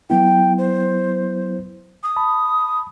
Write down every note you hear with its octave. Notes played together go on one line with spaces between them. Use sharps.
F#3 B3 E4 G5
C5
D#6
A5 B5